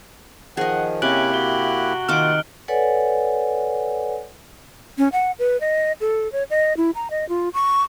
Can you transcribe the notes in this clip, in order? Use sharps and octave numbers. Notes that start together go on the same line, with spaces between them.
D#3 F3 G#4 D#5 F#5
C3 A#3 C#4 E4 G4 F#6 D7 F#7
F#4 G7
D#3 A#3 F4 F#5 D6 F6 D7
A4 B4 C#5 D5 F#5 G#5
C#4
F#5
B4
D#5
A4
C#5
D#5
E4
A#5
D#5
F4
C#6